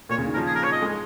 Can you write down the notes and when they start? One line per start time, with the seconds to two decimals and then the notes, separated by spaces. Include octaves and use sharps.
0.09 A#2 C#5
0.18 C#3
0.27 D#3
0.34 F3 A#4
0.46 G#4
0.55 A#4
0.63 C#5
0.72 D#5
0.82 G#3